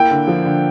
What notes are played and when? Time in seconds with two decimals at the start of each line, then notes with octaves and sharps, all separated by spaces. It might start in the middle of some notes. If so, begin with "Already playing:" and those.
Already playing: A#3 E4 G5
0.11 D3
0.28 F3
0.45 D3